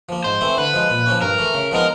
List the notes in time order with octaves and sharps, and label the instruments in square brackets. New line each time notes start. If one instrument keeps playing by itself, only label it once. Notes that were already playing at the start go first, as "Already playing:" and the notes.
[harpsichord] F3 A#3
[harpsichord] G#2 [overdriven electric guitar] C5
[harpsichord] E3 A3 C4 E4
[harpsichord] D3 [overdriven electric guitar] B4
[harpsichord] F3 G#3
A#2
F3 A#3 C#4
[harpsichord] G2 [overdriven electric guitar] A#4
[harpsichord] E3 A3
C#3
[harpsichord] F3 G#3 B3 D#4 [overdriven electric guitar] A#4